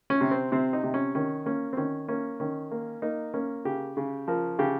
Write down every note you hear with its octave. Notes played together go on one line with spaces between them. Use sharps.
C#4
C3
C4
C3 C4
D#4
C3
C#4
D#3 C#4
A#3 C#4
C4
D#3 C#4
A#3 C#4
D#3 C#4
A#3
A#3 D#4
A#3 C#4
C#3 G4
C#3
F3 A#4
C#3 G4